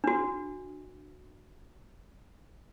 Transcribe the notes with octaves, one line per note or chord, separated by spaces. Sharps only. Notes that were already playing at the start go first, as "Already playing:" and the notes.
D4 F#4